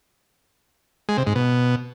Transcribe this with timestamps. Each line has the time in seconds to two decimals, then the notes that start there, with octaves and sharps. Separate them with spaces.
1.09 G#3
1.18 C3
1.27 G#2
1.35 B2